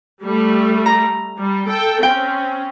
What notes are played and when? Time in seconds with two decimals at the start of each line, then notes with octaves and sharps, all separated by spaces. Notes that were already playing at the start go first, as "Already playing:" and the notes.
0.23 G3 A3
0.86 A#5
1.38 G3
1.68 A4 G5
2.03 C4 C#4 G5